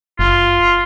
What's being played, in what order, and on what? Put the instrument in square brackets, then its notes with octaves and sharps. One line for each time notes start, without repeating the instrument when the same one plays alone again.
[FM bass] F#1 [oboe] F4